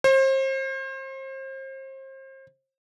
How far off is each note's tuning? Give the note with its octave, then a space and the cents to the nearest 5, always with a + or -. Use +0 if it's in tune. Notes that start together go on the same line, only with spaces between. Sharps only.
C5 +35